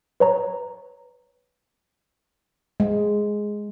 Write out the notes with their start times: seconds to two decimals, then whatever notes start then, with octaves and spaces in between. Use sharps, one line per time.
0.20 B4 C#5 A#5
2.80 G#3